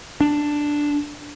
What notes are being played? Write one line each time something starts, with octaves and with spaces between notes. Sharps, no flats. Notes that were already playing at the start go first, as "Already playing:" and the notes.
D4